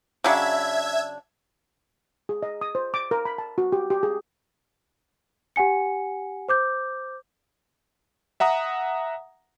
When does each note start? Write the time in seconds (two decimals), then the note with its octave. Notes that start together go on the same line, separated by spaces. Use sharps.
0.24 C#3 F#3 D4 E5 G#6
2.29 G#4
2.43 D#5
2.61 D#6
2.75 C5
2.94 D6
3.11 A#4
3.25 B5
3.38 A5
3.58 F#4
3.72 G4
3.90 G4
4.03 G#4
5.56 G4 F#5 G#5 C#7
6.48 C5 D6 G6
8.40 E5 F#5 A#5 D#6